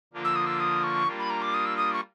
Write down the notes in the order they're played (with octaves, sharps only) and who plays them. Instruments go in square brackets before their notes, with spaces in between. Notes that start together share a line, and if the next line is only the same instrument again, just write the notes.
[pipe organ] D3 F3 A#3 D4 F4
[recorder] E6
D#6
E6
D#6
C#6
[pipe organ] G3 A#3 D4 F4
[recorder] B5
A#5
D6
D#6
E6
D#6
C#6